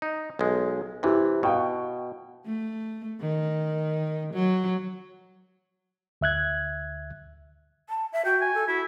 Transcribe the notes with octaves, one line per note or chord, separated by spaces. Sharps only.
D#4
B1 G#3
C3 E3 E4 G4
B2 F5 G5 C#6
A3
D#3
F#3
D2 E5 F#6 G#6
A5
E5
F#4 G5
G#5
A4
E4 F#4